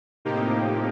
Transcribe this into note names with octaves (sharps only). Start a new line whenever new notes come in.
A2 C3 F3 A#3 D#4 G4